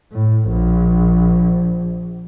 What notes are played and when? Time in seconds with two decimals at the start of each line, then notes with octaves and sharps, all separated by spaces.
0.13 A2
0.49 A#1